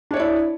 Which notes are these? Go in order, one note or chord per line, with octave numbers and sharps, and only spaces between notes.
D4 E4 C#5 D5